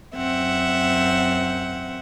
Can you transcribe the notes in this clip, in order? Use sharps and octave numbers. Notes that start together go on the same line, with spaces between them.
F#2 C4 E5 F#5